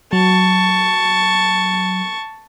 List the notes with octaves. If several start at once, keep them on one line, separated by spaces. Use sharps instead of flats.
F#3 A5 C#6